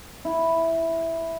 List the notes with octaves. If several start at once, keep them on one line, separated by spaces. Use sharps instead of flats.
E4